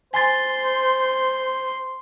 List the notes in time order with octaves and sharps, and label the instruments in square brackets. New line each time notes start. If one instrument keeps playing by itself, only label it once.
[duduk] C5 [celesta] G#5 A6 [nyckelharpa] C6